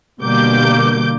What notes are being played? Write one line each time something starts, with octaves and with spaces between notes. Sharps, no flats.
B2 D3 G3 A#3 D6 G6